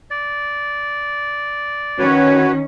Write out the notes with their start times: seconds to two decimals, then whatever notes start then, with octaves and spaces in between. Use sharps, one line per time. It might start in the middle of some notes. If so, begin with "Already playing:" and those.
0.11 D5
1.99 D#3 C#4 F#4 B4 C#5